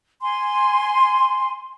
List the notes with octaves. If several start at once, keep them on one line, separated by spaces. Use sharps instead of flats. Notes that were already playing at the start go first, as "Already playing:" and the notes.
G#5 C6